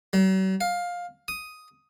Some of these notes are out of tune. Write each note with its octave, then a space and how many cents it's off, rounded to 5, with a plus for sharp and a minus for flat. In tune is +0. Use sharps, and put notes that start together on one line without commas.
F#3 +45
F5 +15
D#6 +5